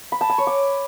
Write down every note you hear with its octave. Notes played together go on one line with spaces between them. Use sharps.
B5
A5
G#5
C#5
D6